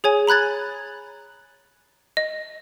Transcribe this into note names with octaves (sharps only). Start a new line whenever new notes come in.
G#4 C#5 G#5
A#5 B5 F#6 G#6 A6
D#5